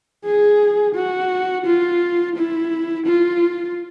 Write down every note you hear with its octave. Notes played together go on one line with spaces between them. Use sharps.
G#4
F#4
F4
E4
F4